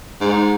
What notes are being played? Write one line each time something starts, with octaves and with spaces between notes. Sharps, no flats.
G#2